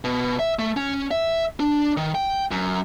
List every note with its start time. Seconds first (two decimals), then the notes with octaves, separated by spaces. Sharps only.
0.04 B2
0.39 E5
0.59 A3
0.77 C#4
1.11 E5
1.60 D4
1.97 D#3
2.15 G5
2.51 F#2